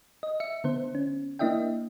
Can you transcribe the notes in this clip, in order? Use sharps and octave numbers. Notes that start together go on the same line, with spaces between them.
D#5
E5 C#7
D3 B3 C5
C#4
A#3 D4 E4 D#5 E5 G5